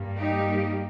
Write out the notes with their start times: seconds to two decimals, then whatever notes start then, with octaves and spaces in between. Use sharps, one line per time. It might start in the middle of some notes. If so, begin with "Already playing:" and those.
Already playing: G2 G3 A#3
0.18 D#4 G4